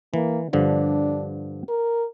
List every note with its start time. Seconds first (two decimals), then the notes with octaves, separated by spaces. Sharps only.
0.14 E3 A#3
0.53 G2 D3 F3 D4
1.69 A#4